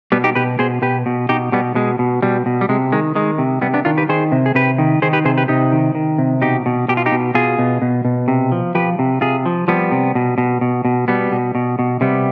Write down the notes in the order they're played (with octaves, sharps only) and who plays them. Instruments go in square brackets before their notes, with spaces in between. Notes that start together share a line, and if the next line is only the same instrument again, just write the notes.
[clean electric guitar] B2 G3 B3
D#4 G4
B2 G4 B4
B2 G#4 C5
B2 G4 B4
B2
B2 D#4 G4
B2 G3 B3
B2 G#3
B2
B2 G3
B2
G3
C3 G#3
D#3 G#3
D#3 G#3
C3
C3 G3 B3
B3 D4
D#3 D4 F4
G4 B4
D#3 G#4 C5
C3
G#4
C3 G4 B4
D#3
D#3 G#4 C5
G4 B4
C3 G#4 C5
G4 B4
C3 D#4 G4
D#3
D#3
C3
B2 D#4 G4
B2
B2 G4
F4
D#4 G4
B2
B2 F4 G#4
B2
B2
B2
C3
F3
F3 G4 B4
C3
C3 F4 G#4
F3
F3 G3 B3
C3
B2
B2
B2
B2
B2 G3 B3
B2
B2
B2
C3 G3 B3